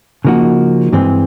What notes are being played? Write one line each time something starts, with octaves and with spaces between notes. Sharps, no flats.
C#3 F3 A#3 D#4 F#4
G2 E3 G#3 C4